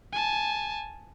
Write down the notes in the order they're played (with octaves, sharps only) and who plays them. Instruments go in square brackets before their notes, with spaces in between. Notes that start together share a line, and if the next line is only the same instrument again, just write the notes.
[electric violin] G#5 A5